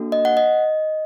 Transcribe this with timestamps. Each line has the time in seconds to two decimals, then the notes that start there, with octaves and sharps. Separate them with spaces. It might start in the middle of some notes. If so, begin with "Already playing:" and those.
Already playing: A#3 D4 F#4 A4
0.12 D#5
0.25 F#5
0.37 D#5